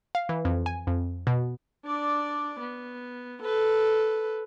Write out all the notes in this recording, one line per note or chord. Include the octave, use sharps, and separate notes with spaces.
F5
E3
F2
G#5
F2
B2
D4 D5
B3
A4 B4